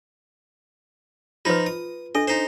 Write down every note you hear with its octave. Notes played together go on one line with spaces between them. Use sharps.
F3 D#4 F4 B4
D#6
D4 A4 D#5
D#4 C5